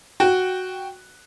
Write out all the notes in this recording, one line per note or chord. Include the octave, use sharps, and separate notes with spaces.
F#4 G5